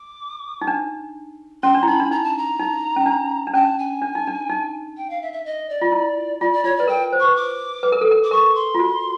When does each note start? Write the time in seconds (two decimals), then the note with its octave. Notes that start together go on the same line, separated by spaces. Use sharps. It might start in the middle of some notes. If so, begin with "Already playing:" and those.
Already playing: D6
0.61 D#4
0.67 D4
1.63 C#4 C6
1.75 D4
1.83 E4
1.87 D#4 B5
2.00 D4
2.11 D#4 A#5
2.24 A5
2.37 A#5
2.59 D#4
2.96 C#4
3.06 D4
3.47 D4
3.54 C#4 A5
3.78 G#5
4.02 D4
4.15 D#4
4.27 D4
4.49 D#4
4.97 G5
5.10 F5
5.22 E5
5.33 E5
5.45 D#5
5.69 D5
5.81 F4
5.92 E4
6.41 F4 D5
6.52 D5
6.64 F4 C#5
6.76 B4 D5
6.88 A#4 G5
7.13 C5
7.20 B4 C#6
7.36 D6
7.83 B4
7.92 A#4
8.01 A4
8.11 A#4
8.24 D6
8.31 A#4 C#6
8.55 C6
8.75 F4
8.79 F#4